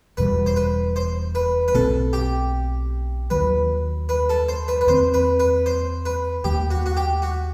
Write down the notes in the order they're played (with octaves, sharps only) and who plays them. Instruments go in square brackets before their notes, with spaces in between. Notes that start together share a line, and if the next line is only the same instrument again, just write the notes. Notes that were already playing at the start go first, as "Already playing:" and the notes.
[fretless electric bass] E1 E2 B2 G3 [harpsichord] B4
[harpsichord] C5
B4
C5
B4
B4
[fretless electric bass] B1 B2 A3 C4 [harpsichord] A4
[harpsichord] G4
[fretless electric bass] D#2 D#3 F#3 [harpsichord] B4
[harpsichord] B4
A4
C5
B4
B4
[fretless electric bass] E2 D#3 A3 C4 [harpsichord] C5
[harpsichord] B4
B4
C5
B4
[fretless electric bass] D#2 D#3 A3 [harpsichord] G4
[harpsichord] F#4
F#4
G4
F#4